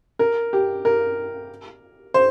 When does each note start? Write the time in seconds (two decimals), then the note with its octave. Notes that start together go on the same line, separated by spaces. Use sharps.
0.19 A#4
0.53 G4
0.85 A#4
2.14 C5